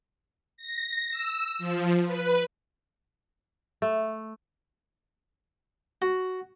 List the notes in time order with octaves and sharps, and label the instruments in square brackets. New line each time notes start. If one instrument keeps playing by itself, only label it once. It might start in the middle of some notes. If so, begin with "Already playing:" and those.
[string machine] A#6
E6
F3
B4
[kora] A3
[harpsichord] F#4